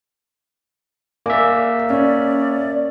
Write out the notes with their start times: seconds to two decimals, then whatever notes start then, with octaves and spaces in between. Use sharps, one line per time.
1.26 A#3 D5 E5 G#5 D6
1.90 C#4 D5